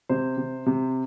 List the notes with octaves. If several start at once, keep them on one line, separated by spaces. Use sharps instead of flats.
C3 C5
C3
C3